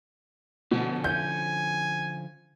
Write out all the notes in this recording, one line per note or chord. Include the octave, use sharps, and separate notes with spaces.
B2 D3 F3 C#4
G#5 G6